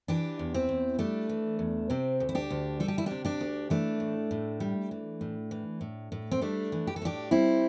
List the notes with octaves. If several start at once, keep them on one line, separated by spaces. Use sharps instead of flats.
E3 D4 G4
E2
C4 E4
E2
G3 A3 D4
E3
E2
C3 C4
D2
E4
D4 G4
D2
G3 A4
G4
E4
C3 D4 G4
D4 G4
D2
E3 A3 D4
A2
A2
G3
E3
A2
E3
A2
A2
C4
G3 A3 D4
E3
G4
A4
A2 D4 G4
G3 C4 E4